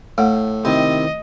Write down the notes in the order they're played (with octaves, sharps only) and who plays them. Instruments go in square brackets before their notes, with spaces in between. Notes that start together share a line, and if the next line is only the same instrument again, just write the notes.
[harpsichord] A2 [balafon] A3 F#5
[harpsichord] C3 [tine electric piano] D#3 E4 C5 [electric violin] D#5